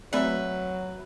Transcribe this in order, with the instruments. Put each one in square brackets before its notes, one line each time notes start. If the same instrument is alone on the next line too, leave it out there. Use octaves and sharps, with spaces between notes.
[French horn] F#3 [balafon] A3 C4 D5 [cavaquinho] B4 E5